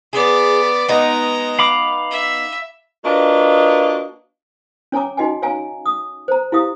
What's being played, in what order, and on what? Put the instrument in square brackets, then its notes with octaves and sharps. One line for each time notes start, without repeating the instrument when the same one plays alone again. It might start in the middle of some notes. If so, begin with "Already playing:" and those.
[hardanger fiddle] B3 D5 [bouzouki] G#4
[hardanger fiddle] G#3 A#5 [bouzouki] B3 D#4 B4
[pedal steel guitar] F5 B5 D6
[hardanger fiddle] E5
[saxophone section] A#3 D4 F4 F#4 B4 D#5
[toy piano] C#4 C#5 G#5 A#5 D6
D#4 F#4 D#5 G5 G#5
C#5 F5 G#5 A#5
D#6
C5 A#5
E4 G4 F5 D#6